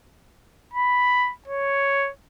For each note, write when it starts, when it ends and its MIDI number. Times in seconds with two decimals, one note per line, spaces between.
0.73 1.32 83
1.48 2.11 73